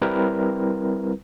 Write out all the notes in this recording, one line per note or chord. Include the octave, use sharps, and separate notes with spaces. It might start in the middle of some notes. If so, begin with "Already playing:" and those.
G3 C4 E4 A#4 B4